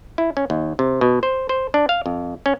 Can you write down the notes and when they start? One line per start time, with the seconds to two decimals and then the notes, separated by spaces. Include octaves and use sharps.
0.18 E4
0.37 C#4
0.50 D#2
0.79 C3
1.01 B2
1.23 C5
1.49 C5
1.74 D4
1.89 F5
2.06 F2
2.46 C#4